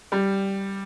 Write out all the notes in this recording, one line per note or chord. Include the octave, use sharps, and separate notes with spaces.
G3